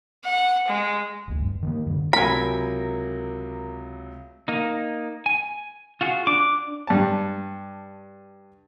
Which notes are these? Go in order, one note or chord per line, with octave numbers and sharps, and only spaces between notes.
F#5
G#3
F1 D2
G2
D#3 A3 A#3
G2 D3
C#2 C3 F#3 A#4 G#5 B5
A#3 D#4
G#5
F4 F#4 G#4
D4 D6
G2 A5